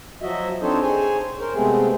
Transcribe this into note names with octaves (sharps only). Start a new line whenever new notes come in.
F3 F#3 F#4 D#5 E5
C4 D4 D#4 A4 C5 C#5
G#4 C5 C#5 G#5
A#4 C5
C3 G#3 A3 B3 C4 G#4